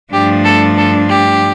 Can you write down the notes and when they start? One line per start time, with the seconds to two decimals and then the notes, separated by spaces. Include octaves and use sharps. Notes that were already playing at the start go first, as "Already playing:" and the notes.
0.12 G2 F3 A3 D4 G4
0.44 A4
0.77 A4
1.09 G4